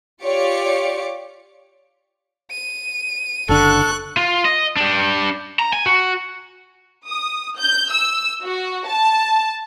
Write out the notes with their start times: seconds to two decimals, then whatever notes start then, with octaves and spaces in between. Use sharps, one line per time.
0.23 F4 G4 C#5 D5 D6 C#7
2.51 D#7
3.49 F#1 D3 D4 A4 C#6 F#6
4.17 F4
4.45 D#5
4.77 D4 G4
5.59 A#5
5.73 G#5
5.86 F#4
7.07 D#6
7.56 G6
7.91 E6
8.44 F#4
8.87 A5